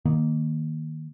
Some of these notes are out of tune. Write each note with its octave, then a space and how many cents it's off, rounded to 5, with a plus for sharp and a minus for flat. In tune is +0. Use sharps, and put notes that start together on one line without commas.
D#3 -5 A#3 +0